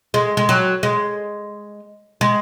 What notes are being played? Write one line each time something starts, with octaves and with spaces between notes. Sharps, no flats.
G#3
G#3
F#3
G#3
G#3